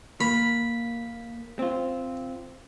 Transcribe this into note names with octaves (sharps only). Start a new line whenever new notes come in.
A#3 B5
C4 F4